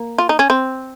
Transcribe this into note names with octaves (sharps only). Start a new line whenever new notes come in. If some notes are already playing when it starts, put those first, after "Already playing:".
Already playing: A#3
F4
D#4
C#4
C4